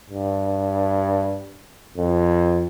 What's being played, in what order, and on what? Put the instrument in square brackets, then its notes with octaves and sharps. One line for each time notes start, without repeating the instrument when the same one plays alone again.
[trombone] G2
F2